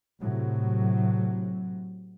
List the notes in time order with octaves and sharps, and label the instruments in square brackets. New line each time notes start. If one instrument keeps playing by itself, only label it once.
[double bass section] A2 C3 F#3